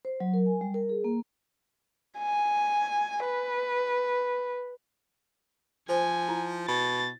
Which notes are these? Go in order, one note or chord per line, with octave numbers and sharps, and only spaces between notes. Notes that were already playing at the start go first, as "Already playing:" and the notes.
C5
F#3
A#4
G#5
G3
A#4
G#4
A#3
G#5
B4
F3 C5 G#5
E4
B2 A6